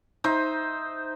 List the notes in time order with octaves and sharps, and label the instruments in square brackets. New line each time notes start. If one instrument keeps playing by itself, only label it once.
[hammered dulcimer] D#4 C5 E5